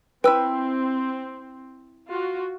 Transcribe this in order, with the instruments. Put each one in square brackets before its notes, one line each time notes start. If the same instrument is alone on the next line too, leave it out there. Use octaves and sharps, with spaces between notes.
[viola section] C4 [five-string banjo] E4 B4 [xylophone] G5 E6
[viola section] F4 F#4